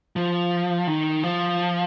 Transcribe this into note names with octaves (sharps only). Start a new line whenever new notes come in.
F3
D#3
F3